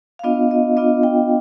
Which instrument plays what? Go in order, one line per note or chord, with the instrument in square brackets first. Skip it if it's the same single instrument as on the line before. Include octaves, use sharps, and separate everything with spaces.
[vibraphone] F5
B3 D4 F4 D#5
D#5
B3 D4 F4 D#5
G5